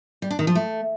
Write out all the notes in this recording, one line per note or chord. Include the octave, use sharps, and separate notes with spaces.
G3
D4
D#3
F3
A3